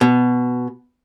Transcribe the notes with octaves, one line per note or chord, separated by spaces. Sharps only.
B2